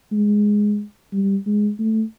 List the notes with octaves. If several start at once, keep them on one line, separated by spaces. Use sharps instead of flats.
G#3
G3
G#3
A3